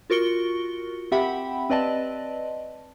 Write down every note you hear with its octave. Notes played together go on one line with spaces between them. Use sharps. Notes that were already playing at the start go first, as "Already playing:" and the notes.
F4 F#4 A#4 C#6 C#7 G7
C4 G4 E5 F#5 G5 B5
C4 B4 D5 D#5 A5